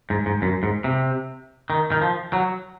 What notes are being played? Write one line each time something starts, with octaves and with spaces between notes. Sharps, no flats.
G#2
G#2
F#2
G#2
C3
D#3
D#3
F3
F#3